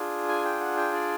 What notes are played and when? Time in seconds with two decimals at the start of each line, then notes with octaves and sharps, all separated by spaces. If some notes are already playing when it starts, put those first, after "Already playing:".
Already playing: D4 F4 G#4
0.29 G#5
0.45 G5
0.61 F#5
0.77 G5
0.93 D5